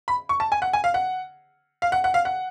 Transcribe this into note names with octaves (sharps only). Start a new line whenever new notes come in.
B5
C#6
A5
G#5
F#5
G#5
F5
F#5
F5
F#5
F#5
F5
F#5